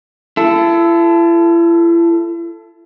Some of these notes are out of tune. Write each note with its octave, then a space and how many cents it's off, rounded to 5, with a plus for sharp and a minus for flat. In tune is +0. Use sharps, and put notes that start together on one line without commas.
E4 +40 A4 +0